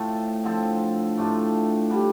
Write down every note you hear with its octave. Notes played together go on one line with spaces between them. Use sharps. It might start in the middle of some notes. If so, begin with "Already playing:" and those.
Already playing: A2 A3 C4 F4 A4
D3 F3 C4 A4
A2 A3 D4 F4
D3 G3 D4